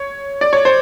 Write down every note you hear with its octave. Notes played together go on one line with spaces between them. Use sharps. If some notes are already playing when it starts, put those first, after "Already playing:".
Already playing: C#5
D5
C#5
C5